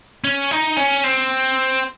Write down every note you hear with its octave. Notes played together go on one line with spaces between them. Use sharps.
C#4
D#4
C#4
C4